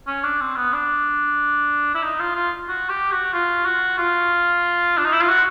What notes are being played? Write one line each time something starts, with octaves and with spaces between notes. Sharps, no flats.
C#4
D4
C4
B3
D4
E4
D#4
F4
F4
F#4
G4
F#4
F4
F#4
F4
D4
D#4
E4
F4
F#4